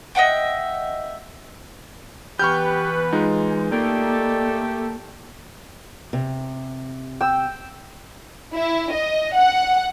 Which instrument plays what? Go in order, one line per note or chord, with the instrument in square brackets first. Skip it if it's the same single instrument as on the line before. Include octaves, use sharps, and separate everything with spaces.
[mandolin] D#5 E5 F#5 G5
[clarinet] E3 [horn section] B3 B4 [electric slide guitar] G4 [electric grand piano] C#6 F6 G6
[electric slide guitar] G#3 [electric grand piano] D#4 F4
[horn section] A3 G4 A4 [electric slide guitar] A#3 [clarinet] D5
[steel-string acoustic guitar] C3
[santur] G5 E6
[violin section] E4
D#5
F#5